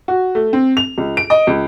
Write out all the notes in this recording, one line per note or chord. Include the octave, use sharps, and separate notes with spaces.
F#4
A3
C4
F7
C#2
D7
D#5
C#2